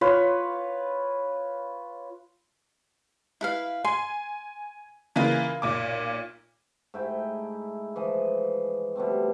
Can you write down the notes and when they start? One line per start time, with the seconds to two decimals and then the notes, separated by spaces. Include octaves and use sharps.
0.01 F4 B4 C#5
3.41 E4 B4 F5
3.84 G#5 C6
5.16 C#3 E3 A#3 F4 G#5
5.62 B1 A#2 D6
6.94 G#2 A3 E4 G5
7.96 E3 F3 D#5
8.96 B2 G3 A3 C4